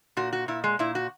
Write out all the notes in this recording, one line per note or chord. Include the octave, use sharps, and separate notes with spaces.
A#2 F#4
F#4
A#2 E4
G#3
A#2 E4
F#4